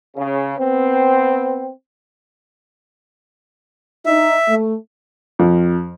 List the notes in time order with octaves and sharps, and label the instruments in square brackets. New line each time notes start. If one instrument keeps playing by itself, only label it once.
[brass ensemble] C#3
B3 C4
[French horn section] D#4 [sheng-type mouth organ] E5
[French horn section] A3
[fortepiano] F2